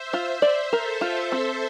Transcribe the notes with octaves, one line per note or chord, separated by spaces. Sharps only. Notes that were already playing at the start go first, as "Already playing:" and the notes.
Already playing: C5 E5
F4
D5
A4 A#4 C5
F4
A4 C5
C4